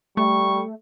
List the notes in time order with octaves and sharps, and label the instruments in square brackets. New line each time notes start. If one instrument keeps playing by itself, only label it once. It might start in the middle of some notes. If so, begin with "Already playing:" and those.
[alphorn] G3 [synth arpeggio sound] A3 [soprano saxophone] C#6